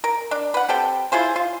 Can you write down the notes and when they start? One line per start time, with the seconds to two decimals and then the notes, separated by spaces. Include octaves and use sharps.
0.04 A#4
0.31 D4
0.54 B4 F#5
0.68 C4 G4 A4 G5
1.12 E4 F4 G#4 C5
1.36 F4